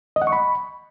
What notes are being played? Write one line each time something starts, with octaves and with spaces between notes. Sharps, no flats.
D#5
F#5
C#6
B5